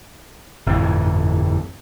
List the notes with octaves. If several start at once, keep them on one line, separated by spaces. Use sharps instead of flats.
G1 F2 A2 E3